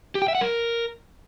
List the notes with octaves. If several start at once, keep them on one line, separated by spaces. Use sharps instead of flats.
G4
G5
E5
F#5
A#4